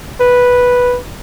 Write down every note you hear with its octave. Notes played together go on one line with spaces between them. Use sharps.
B4